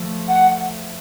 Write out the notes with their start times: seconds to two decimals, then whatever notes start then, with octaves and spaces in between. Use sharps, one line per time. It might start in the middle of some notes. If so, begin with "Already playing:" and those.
Already playing: F3 A3
0.28 F#5